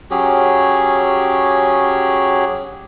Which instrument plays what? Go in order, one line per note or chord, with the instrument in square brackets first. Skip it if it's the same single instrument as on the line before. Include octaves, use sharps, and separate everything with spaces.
[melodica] F#3 C#4 G4 G#4